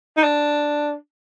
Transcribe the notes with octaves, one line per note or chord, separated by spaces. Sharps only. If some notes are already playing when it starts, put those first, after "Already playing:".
D#4
D4